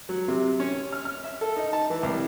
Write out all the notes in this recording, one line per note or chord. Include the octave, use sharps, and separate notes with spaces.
F#3
C3
C#4
F6
F6
E5
A4
D#4
A5
E3
C2